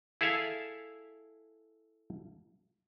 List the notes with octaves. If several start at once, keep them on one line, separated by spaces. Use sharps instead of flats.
E4 G#4 A4 E5 F5